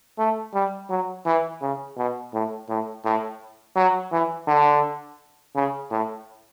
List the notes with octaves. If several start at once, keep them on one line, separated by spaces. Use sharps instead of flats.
A3
G3
F#3
E3
C#3
B2
A2
A2
A2
F#3
E3
D3
C#3
A2